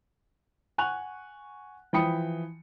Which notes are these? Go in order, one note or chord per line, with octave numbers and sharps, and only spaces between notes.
F#5 G#5 C#6 F#6 F7
E3 F3 G5 B5 D#6 C#7